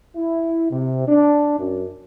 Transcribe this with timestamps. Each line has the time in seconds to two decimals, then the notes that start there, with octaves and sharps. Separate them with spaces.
0.17 E4
0.71 C3
1.08 D4
1.60 F#2